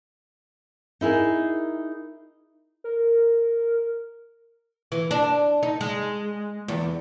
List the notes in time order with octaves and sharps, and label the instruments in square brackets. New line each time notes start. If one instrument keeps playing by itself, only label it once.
[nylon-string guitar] D#4 E4 G#4 A#4
[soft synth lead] A#4
[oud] E3
D4
D#4
G#3
E2